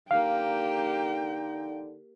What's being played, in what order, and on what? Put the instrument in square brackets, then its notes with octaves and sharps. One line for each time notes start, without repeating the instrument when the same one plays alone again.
[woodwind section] D3 D#4 [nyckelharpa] A#3 G4 [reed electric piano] F5 [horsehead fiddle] G5